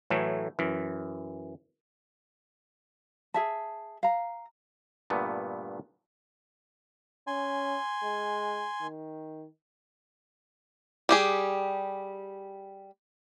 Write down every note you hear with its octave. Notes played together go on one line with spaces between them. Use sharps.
A2 E3 F#3 A3
F#2 E3
G#4 E5 A5
F5 A#5
G2 A#2 D3 A3 B3
C#4 G#5 C6
G#3
D#3
G3 G4 G#4